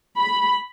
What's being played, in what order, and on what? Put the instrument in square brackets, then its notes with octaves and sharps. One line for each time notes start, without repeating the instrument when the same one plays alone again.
[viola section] B5